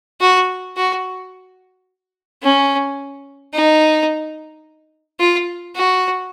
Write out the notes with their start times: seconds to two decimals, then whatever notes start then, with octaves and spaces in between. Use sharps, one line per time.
0.21 F#4
0.77 F#4
2.43 C#4
3.54 D#4
5.20 F4
5.75 F#4